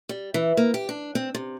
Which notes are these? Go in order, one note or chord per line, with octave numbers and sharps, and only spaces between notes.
G3
E3
A#3
G4
D4
C4
C3